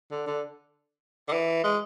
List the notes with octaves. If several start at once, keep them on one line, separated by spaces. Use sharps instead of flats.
D3
D3
D3
E3
G#3